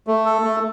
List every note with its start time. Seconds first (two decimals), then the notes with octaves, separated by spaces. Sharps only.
0.07 A3
0.26 A4
0.44 A3